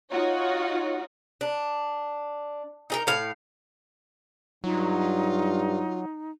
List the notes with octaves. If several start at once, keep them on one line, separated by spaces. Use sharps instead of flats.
D#4 F4 F#4 C#5
D4
D#4 G#4 A#4
A2 F5
G2 F#3 D#4 F4